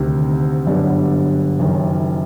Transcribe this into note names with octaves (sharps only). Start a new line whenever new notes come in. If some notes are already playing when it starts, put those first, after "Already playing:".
Already playing: D2 C3 D#3
G1 F#2 D3 G3 B3
F#1 F#2 D#3